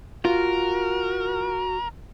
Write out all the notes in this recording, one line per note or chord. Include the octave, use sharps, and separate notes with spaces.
F4 F#4 A#4